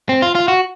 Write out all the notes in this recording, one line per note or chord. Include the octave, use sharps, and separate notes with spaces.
C4
F4
F4
F#4